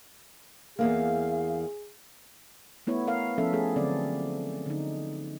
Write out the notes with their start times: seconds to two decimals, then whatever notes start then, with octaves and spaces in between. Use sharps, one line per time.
0.79 E2 G#2 A#3 G#4 F5
2.87 A3 B3 E4 C#5
3.07 E4 A#4 F5
3.38 F3 B3 C#4 A4 E5
3.53 A3 G#4 A4
3.76 D3 F#3 C4 D5
4.66 D3 D#4